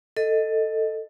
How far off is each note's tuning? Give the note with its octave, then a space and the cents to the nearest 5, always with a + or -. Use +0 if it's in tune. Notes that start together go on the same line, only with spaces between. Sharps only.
A4 +10 D#5 +0